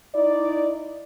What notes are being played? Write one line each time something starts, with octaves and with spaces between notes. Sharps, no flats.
D#4 E4 D5